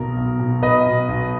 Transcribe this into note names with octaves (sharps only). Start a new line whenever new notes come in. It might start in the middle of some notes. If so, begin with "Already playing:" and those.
Already playing: B1 B2 A#4
B1
B2
B1 B4 D#5
B2
B1